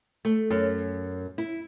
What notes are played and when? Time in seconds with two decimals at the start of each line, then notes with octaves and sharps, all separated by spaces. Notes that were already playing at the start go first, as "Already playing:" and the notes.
0.25 A3
0.50 F#2
1.38 E4